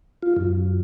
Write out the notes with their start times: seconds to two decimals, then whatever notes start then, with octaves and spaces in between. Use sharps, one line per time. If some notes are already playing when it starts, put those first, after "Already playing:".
0.23 F4
0.36 F#2